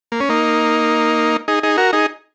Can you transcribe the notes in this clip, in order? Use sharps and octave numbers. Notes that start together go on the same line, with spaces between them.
A#3
C#4
A#3 D#4
D#4 G#4
D#4 G#4
F#4 A#4
D#4 G#4